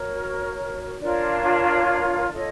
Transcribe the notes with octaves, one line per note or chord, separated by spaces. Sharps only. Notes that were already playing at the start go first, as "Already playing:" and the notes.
Already playing: F#4 A#4 C#5
D4 F4 A#4 C#5 D5
D5
F4 A4 C#5 D#5